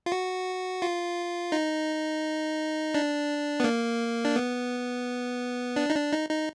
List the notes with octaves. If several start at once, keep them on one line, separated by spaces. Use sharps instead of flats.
F4
F#4
F4
D#4
D4
B3
A#3
D4
B3
D4
D#4
D4
D#4
D#4